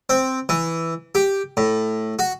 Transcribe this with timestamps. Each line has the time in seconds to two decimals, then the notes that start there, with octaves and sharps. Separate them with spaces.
0.09 C4
0.49 E3
1.15 G4
1.57 A2
2.19 F#4